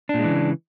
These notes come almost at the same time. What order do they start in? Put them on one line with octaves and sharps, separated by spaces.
D4 A#2 G#3 E3 C#3